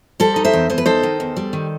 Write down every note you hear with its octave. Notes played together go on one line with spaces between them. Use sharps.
G3 A4 C5
D#4
C5 E5
E2
E2 C5
B4
D#4 A4 C5
D#3
E2
G3
D#3